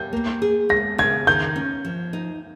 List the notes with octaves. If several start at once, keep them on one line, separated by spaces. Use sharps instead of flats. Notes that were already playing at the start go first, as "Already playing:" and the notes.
Already playing: G3 G6
A#3
G#4
G#3 A#6
C#3 G#6
D#3 G6
C#4
F3
D#4